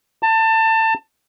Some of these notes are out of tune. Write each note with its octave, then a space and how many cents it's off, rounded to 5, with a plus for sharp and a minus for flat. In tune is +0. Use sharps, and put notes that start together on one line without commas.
A5 +25